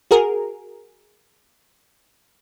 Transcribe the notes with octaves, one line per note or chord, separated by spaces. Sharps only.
F#4 G#4 A#4